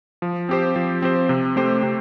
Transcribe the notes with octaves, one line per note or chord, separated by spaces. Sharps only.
F3
C4 G4 C5
F3
C4 G4 C5
C3
A3 C4 G4 C5
C3